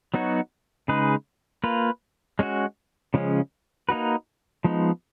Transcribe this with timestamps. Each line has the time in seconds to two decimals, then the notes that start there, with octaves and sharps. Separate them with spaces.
0.14 F#3 B3 D#4 F#4 C#5
0.88 C#3 G#3 D#4 G#4 B4
1.64 A#3 F4 B4
2.39 G#3 C#4 F#4
3.14 C#3 F3 G#3 C#4
3.89 A#3 D#4 F#4 B4
4.64 F3 G#3 B3 D#4